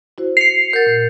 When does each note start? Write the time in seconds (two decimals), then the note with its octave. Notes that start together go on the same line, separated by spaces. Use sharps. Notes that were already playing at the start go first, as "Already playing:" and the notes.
0.18 E4 F#4 C5
0.37 C7 C#7 F7
0.73 A#4 F#5 G6 A6
0.87 A#2